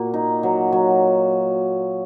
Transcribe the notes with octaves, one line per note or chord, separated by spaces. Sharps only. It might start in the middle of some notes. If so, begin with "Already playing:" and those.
Already playing: A#2 A#3 F#4
D#4
F#3
F#3